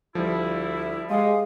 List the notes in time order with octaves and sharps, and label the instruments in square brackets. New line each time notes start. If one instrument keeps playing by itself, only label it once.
[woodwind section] D2 E4 [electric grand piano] F3 G3
[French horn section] G#3 [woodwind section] G4 C6 D#6 [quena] F5